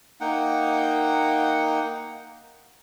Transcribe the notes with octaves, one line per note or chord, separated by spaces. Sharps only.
A#3 D#4 F#5 G5